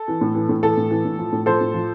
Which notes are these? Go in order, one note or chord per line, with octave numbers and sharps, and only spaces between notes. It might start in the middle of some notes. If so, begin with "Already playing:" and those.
Already playing: A4
E3
A2
E3
A2
E3 A4
A2
E3
A2
F3
A2
F3 A4 C5
A2
F3